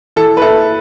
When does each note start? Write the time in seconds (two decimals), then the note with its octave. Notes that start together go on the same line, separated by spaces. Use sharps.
0.16 E3 A4
0.37 B4
0.42 E4 A4